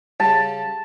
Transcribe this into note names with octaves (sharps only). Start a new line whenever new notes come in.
C#3 G3 A5